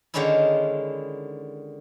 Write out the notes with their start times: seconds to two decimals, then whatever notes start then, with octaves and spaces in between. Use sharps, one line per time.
0.14 D3 D#3 G#3 C#4 D#4 E4